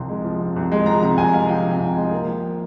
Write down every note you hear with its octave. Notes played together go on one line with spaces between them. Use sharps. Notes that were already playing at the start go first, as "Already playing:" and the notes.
Already playing: C2 C3 F3 C6
G#3
F3
C3
C2
G#3
F3 A#5
C3 A#5
C2 G#5
G#3 F5
F3 G5
C3
C2
G#3
A#3
F3